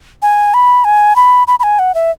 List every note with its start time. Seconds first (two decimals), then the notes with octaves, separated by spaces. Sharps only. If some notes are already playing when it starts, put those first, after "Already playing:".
0.22 G#5
0.54 B5
0.85 G#5
1.16 B5
1.48 B5
1.60 B5
1.63 G#5
1.79 F#5
1.95 E5